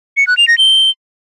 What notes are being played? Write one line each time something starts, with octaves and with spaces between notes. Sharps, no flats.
C#7
F#6
F7
A#6
G7